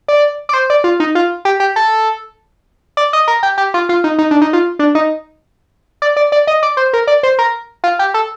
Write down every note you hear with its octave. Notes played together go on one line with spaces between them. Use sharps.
D5
D5
C5
D5
F4
D#4
F4
G4
G4
A4
D5
D#5
A#4
G4
G4
F4
F4
D#4
D#4
D4
D#4
F4
D4
D#4
D5
D5
D5
D#5
D5
C5
A#4
D5
C5
A#4
F4
G4
A4